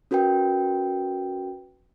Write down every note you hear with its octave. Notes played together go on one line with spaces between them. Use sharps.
C#4 F#4 A#4 B4 G5